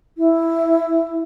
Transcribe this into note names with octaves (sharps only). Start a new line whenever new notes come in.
E4